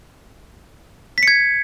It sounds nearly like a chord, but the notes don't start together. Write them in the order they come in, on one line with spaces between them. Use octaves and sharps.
B6 C#7 G#6